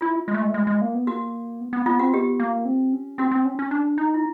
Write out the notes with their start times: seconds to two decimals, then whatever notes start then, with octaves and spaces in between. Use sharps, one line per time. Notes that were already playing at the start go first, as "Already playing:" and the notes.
0.01 E4 F4
0.28 G#3
0.34 A3
0.42 G#3
0.49 A3
0.54 G#3
0.67 G#3
0.81 A#3
0.95 B3
1.07 A#3 F#4
1.61 B3
1.73 B3
1.86 B3 F4
1.99 C4 F#4
2.12 B3 G4
2.40 A#3
2.65 C4
2.93 C#4
3.18 C4 F#4
3.31 C4
3.45 C#4
3.59 C#4
3.71 D4
3.98 D#4
4.14 E4